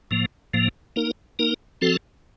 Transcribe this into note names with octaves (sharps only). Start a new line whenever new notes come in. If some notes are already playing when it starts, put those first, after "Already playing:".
A2 F3 A#3
A2 F3 A#3
A#3 D#4 A#4
A#3 D#4 A#4
F3 C4 F#4 A4